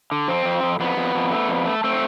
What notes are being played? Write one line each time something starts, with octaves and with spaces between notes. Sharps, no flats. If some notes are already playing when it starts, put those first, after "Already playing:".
D3
F2 C4
F2
F2
F2 B3
F2
F2
A3
F2
A3
A3 C4